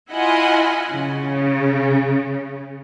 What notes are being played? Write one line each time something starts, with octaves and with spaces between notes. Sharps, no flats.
E4 F4 D#5 F#5 G#5 B5
C#3